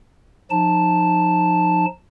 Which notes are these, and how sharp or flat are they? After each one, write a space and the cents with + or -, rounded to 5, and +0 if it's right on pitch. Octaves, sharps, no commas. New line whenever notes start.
F3 +20 D#4 -15 A5 +0